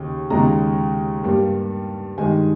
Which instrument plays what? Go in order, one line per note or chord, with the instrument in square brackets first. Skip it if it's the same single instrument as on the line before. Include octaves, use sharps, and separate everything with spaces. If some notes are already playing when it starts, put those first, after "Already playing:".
Already playing: [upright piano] D#2 C#3
D#2 C#3 G#3 A#5
G2 G3 A#3
G2 D#3 G#3 G#5